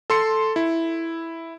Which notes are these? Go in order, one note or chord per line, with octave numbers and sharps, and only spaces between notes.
A4 C6 C#7
E4